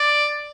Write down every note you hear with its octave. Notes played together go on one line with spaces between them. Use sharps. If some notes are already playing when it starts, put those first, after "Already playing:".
Already playing: D5